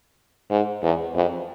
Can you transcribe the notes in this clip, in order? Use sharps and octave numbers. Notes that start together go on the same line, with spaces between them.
G#2
E2
F2